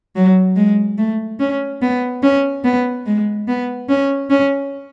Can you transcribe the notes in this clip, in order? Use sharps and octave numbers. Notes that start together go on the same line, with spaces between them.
F#3
G#3
A3
C#4
B3
C#4
B3
G#3
B3
C#4
C#4